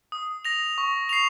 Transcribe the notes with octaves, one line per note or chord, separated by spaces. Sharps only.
D#6
A#6 F7
C#6
C7 F7